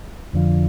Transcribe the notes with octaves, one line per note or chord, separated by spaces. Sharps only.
F2 D3 F3